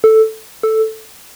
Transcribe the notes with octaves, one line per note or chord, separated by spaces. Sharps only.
A4
A4